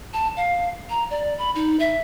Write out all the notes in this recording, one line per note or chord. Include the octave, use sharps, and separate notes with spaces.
A5
F5
A#5
D5
B5
D#4
E5